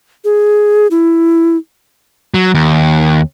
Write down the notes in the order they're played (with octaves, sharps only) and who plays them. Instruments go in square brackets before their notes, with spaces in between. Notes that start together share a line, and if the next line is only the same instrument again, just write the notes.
[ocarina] G#4
E4
[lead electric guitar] F#3
D#2